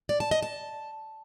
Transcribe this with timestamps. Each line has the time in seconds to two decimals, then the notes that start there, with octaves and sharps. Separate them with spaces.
0.09 D5
0.20 A5
0.31 D#5
0.42 A5